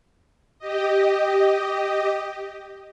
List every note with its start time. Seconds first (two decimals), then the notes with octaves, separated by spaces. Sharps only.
0.59 G4 D#5